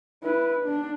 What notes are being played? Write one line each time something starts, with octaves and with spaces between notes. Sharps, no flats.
E4 B4
D4